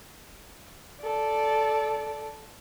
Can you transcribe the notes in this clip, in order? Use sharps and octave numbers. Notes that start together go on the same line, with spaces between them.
A4 D5